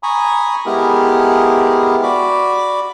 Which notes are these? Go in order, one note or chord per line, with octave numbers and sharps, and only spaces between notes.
G#5 A#5 B5 C#6 D#6
G#3 B3 E4 G4 G#4 A#4
F#4 D5 B5 D6